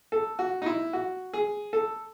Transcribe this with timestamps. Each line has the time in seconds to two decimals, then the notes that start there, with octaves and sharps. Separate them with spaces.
0.12 A4
0.39 F#4
0.62 D#4
0.66 E4
0.93 F#4
1.33 G#4
1.73 A4